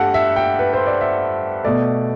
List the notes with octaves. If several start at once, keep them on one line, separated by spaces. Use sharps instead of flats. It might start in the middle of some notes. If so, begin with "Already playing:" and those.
Already playing: G2 A3 G4 A4 F#5
E5
G5
B4
C5
D5
E5
B2 A3 D5